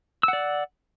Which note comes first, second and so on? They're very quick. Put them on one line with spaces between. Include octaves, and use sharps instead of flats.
E6 F#5 D5